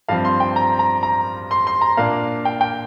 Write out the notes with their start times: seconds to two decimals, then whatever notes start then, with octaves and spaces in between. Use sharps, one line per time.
0.08 G2 F3 C4 F5
0.25 C6
0.40 G5
0.56 A#5
0.79 A#5
1.03 A#5
1.51 C6
1.67 C6
1.81 A#5
1.97 A#2 A#3 D4 F5
2.45 G5
2.61 G5